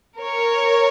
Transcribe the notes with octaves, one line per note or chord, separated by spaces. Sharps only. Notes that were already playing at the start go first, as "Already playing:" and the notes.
A#4 C#5